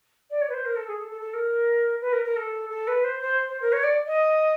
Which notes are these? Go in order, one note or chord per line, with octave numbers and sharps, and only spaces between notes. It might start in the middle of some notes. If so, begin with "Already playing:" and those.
D5
C#5
B4
C5
A#4
A4
G#4
A4
A4
A4
A#4
B4
A#4
A#4
A4
A4
B4
C5
C5
C5
A#4
C#5
D5
D#5